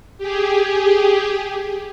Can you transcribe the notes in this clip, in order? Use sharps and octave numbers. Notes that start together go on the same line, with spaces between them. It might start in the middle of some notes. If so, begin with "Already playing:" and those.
G4 G#4